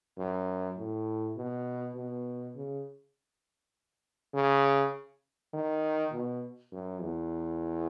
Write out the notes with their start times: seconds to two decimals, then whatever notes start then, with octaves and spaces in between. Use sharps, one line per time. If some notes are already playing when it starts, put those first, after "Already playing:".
0.18 F#2
0.78 A2
1.37 B2
1.96 B2
2.56 C#3
4.34 C#3
5.53 D#3
6.13 B2
6.72 F#2
7.02 E2